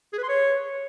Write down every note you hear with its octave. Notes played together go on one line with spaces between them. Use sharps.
G#4
B4
C6
C#5